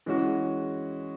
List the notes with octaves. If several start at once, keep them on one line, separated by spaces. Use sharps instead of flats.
E3 G#3 C#4 F#4